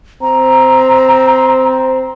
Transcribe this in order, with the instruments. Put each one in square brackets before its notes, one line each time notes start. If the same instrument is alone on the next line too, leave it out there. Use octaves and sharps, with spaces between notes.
[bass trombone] C4 [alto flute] A#5